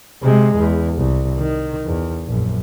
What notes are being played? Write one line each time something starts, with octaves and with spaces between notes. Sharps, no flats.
C3 G#3
E2
C2
D#3
E2
A#1 F#2